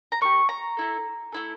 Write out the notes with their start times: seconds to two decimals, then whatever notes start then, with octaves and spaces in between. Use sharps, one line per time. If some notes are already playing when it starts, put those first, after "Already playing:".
0.12 A#5
0.21 A#3 D4 G4 C#6
0.49 A#5
0.77 A3 E4 A4
1.32 A3 E4 A4